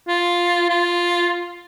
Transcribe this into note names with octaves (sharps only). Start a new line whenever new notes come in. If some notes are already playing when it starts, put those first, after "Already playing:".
F4
F4